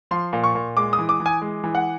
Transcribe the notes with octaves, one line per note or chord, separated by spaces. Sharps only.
F3 C6
A#2
C#6
A#2
G#3 D6
D#6
E3
D6
E3
G#5
G#3
E3
F#5